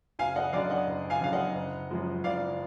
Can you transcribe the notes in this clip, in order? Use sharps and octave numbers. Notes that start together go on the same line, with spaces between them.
F#1 F5 G#5
D#5 F#5
F#2 D3 D5 F5
D#5 F#5
F#1
F5 G#5
F#2 D3 F5
D#5 F#5
F#1
F#2 F3 G#3
F#1 D5 F5